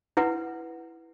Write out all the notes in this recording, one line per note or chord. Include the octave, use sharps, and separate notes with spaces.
E4 B4 F#5